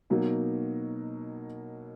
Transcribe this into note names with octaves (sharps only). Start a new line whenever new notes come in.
B2 F#3 A#3 D#4 A#4